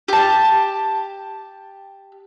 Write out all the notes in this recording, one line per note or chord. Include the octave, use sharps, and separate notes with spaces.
G4 A5